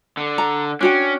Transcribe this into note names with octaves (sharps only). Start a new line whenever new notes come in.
D3
A#5
C#4 D4 F#4 G5